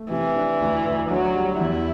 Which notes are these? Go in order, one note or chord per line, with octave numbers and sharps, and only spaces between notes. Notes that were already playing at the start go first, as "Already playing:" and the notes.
Already playing: A3
C3 E3
D4
D2
D2
D3 F#3
G3
E2 E4